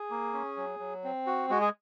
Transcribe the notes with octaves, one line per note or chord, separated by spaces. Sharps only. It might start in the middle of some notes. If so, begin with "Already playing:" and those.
Already playing: G#4
A#3
C#4
F#3
F#3
C4
F#4
G#3 F#4
G#4